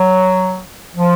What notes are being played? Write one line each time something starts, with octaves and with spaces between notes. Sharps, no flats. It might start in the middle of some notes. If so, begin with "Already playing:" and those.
Already playing: F#3
F3